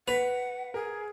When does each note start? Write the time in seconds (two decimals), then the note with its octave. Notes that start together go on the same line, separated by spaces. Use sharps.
0.08 B4 F#5 B6 F7
0.74 G#4 A#4